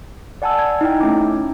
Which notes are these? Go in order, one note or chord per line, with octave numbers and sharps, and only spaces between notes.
D5 F#5 G#5 A5 E6
G#6
D#4 E4 G5
A3 C#4 D6